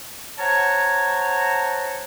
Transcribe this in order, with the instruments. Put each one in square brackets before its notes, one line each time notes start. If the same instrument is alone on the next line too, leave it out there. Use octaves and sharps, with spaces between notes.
[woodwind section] C5 C#5 F#5 A5 A#5